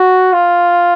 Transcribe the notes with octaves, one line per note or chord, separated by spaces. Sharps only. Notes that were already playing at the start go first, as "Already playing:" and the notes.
Already playing: F#4
F4